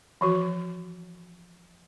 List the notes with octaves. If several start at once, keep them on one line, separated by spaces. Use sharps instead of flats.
E3 F3 F#4